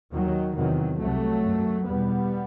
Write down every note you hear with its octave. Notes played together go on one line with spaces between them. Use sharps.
D#2 D#3 F#3
E2 C3 D#3 F#3
C2 C3 F#3 A3
F#2
E2 B2 G3 B3